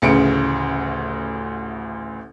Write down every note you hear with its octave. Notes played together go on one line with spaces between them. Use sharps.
A1 D2 C#3 C#7 D7